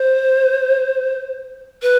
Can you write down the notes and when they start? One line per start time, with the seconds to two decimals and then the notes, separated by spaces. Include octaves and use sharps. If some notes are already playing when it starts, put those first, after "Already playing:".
Already playing: C5
1.82 B4